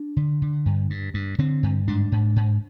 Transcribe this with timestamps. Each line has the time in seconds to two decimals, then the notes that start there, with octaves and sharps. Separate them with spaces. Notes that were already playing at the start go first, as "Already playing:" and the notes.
Already playing: D4
0.17 D3
0.42 D3
0.66 G2
0.90 G2
1.14 G2
1.38 D3 C4
1.63 G2
1.88 G#2 D4
2.12 G#2
2.36 G#2